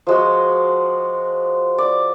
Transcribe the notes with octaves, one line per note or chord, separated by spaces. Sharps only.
F3 G#3 F#4
D5